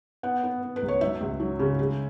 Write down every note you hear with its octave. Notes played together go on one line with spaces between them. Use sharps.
B3 F#5
B3
B3
B4
C#2
C#5
F#3 E5
C#2
F#3
C#3
G#3